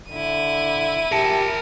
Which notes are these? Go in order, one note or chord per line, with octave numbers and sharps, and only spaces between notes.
D3 E4 D#7
G4 A#4 A5